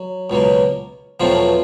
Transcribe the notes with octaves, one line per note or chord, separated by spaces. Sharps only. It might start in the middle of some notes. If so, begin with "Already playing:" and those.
Already playing: F#3
C#2 B2 F#3 A#3
E2 B2 F3 F#3 A3 C4 F4